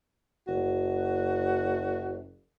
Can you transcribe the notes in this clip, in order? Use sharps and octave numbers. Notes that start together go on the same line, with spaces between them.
F#1 F#4